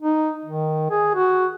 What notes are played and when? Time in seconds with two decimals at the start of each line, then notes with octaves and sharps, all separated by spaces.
0.02 D#4
0.45 D#3
0.90 G#4
1.15 F#4